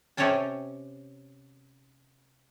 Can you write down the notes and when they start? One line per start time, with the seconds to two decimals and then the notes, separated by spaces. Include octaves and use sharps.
0.17 C3 C#4 C#5 D5 G5 A5